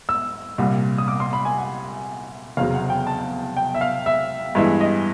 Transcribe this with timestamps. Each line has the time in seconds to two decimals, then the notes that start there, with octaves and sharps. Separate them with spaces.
0.09 E6
0.58 C2 A#2 G3
0.98 D#6
1.08 D6
1.20 C6
1.33 B5
1.45 G#5
1.58 F#5
2.57 F1 E2 C#3 F#3 F5
2.74 F#5
2.90 G5
3.07 A5
3.57 G5
3.75 E5
3.81 F5
4.06 E5
4.55 G2 E3 G#3 B3 E5
4.81 D#5